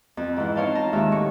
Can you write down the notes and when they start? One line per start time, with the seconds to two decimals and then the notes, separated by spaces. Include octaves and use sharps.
0.17 F2
0.36 G#2 E3 F3 E4 F4
0.56 D#4 C5 C#5 F5 G5 A5
0.75 F4 A5 A#5
0.92 D#2 D#3 G#3 G4 E5 F6
1.12 A2 C#6